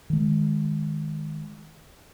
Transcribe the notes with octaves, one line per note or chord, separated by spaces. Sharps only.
D#3 G#3